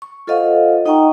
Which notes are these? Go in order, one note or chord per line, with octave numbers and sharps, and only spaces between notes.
C#6
F4 A4 C5 D#5 F5 F#5
D#4 D#5 F#5 G5 A#5 C#6